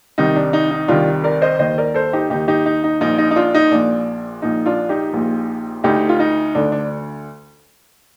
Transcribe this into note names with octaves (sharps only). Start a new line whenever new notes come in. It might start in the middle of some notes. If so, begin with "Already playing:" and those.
C2 C3 D#3 D#4
D4
D#4
D#4
C2 C3 D#3 D4 F4
A#4 D5
C5 D#5
D#2 D#3 C5 D#5
A#4 D5
A4 C5
D#4 G4
D#2 D#3 D#4 G4
D#4 G4
D#4
D#4
A#1 A#2 D#4
D#4
D#4
D4 F4
D#4
A#1 A#2 D4
A#1 A#2 D#4
D4 F4
D#4 G4
A#1 A#2
D2 D3 D#4 G4
F4
D#4
D2 D3 D4
D4